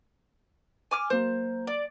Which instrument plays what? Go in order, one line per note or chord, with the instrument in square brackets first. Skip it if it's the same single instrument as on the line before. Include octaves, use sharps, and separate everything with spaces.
[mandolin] G#5 D6 F6
[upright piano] F#3 A#3 [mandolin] C5
[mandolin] D5